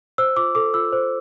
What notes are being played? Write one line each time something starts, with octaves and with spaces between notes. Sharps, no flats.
C5 E6
F4 D6
A4 D6
F4 E6
C5